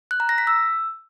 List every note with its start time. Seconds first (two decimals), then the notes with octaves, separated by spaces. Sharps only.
0.11 F#6
0.20 A#5
0.29 A#6
0.38 B6
0.47 E6